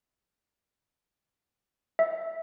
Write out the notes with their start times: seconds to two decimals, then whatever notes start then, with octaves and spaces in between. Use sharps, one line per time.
1.99 E5